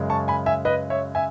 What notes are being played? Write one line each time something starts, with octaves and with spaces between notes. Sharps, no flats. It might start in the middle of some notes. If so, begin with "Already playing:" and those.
Already playing: F#2 C#3 G#3
A5 C#6
G#5 B5
E5 G#5
B4 D#5
C#5 E5
E5 G#5